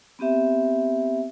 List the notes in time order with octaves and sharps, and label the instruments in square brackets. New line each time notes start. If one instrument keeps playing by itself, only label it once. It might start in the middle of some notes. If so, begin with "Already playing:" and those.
[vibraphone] B3 C4 G4 E5